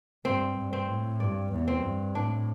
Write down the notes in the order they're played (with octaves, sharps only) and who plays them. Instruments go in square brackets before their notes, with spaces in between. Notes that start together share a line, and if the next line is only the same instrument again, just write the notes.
[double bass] G2 [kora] C4
[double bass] G2
[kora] C4
[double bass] A2
[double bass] G2 [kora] D5
[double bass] E2
[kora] C4
[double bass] G2
[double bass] A2 [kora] D4